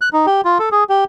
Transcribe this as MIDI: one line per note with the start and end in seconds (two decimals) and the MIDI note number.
0.01 0.09 90
0.13 0.26 63
0.26 0.41 67
0.45 0.58 65
0.59 0.69 69
0.72 0.84 68
0.89 1.04 67